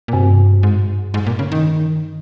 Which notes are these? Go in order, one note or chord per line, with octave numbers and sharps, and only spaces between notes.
A#2
G2 C3
G#2
G#2
A#2
C#3
D#3